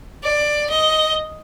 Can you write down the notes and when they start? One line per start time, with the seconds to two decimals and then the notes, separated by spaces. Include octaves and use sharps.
0.24 D5
0.70 D#5